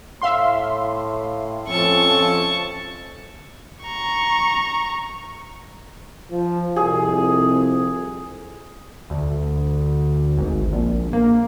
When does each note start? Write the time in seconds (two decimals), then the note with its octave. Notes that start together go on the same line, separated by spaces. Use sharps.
0.22 A2 E5 F5 C6
1.68 F2 F3 C#4 A4 A5 C#6
3.84 A#5 C#6
6.31 F3
6.76 C2 F2 C3 G#4
9.10 D2
10.38 G#1
10.72 A#1
11.13 A#3